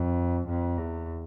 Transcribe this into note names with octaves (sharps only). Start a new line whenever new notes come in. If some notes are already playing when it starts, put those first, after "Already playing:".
Already playing: F2
F2
E2